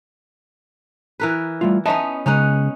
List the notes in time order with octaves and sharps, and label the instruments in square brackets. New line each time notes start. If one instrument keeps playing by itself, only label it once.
[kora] E3 A#4 B4
[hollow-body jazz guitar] G3 A3 F4
[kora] B3 C#4 D#4 [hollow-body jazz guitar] D#5 E5 A5
[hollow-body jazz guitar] C#3 G#3 [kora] C#4 D#4 F#5